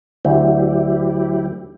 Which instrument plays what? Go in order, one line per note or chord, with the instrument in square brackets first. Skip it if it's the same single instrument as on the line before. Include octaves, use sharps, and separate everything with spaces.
[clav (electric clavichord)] D2 [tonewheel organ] F#3 E4 G4